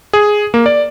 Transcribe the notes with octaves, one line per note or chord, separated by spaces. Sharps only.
G#4
A#3
D5